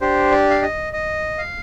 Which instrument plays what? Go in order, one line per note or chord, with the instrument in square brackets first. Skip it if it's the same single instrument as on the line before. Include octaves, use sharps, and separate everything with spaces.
[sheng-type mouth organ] D4 G4 C5
D5
F5
D#5
D#5
F5